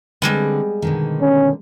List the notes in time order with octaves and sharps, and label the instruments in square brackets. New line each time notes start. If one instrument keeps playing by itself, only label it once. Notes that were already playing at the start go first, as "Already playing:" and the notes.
[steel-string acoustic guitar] D3 C4 [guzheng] G3 G#3 B3
[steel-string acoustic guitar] B2 D3 D#3
[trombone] C#4